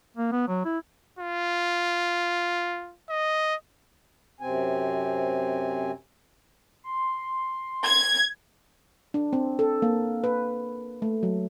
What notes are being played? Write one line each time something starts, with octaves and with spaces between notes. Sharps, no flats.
A#3
B3
F#3
E4
F4
D#5
F#2 C3 C4 G#5
C6
G#6
D4
C4
A4
A#3
B4
A3
F#3